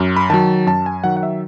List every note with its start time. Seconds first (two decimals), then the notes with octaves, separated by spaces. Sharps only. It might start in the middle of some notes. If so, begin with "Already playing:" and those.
Already playing: F#2
0.16 B5
0.30 D#3 F#3 A5
0.67 F#2 A5
0.86 G#5
1.04 D#3 F#3 F#5
1.17 F#5
1.23 E5